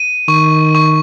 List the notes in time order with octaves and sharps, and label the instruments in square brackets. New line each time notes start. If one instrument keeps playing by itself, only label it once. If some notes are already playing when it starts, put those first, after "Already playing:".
Already playing: [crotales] D#7
[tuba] D#3 [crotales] C#6
[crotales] C#6